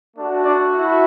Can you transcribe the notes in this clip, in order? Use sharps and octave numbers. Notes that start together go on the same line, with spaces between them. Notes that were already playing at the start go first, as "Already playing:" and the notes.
A3 D4 F#4
D4 D5
E4 E5